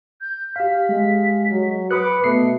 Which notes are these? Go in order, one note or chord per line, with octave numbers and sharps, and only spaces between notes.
G6
G4 F5 B6
G#3
F#3
B4 B5 D6 D#6 F#6 C#7
B2 A3 C7 C#7